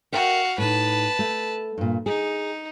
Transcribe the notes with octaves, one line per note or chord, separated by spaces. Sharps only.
F#4 A#4 E5 F5 G5
A2 D#4 B4 A5
A3
G2 A#2
D#4 G#4